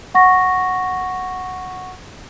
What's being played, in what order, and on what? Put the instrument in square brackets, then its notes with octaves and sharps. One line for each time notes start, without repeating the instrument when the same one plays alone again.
[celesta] F#5 C#6 A#6